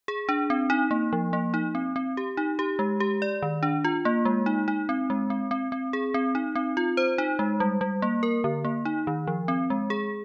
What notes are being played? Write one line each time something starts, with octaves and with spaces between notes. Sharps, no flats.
G#4
D4
C4
D#4
A#3
F3
A#3
D#4
C4
C4
G4
D#4
G4
G#3
G4
D5
D#3
D4
F4
A#3
G#3
D#4
D#4
C4
G#3
C4
C4
C4
G#4
C4
D#4
C4
F4
C5
D#4
G#3
G3
G3
A#3
A#4
D3
A#3
D#4
D#3
F3
C4
G#3
G#4